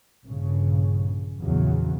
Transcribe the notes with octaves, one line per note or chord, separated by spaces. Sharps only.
A#1 G2 C#3
A#1 E2 C#3 F#3